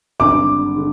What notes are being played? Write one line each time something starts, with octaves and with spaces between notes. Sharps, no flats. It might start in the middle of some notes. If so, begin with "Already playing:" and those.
G#1 G2 D3 D6
D3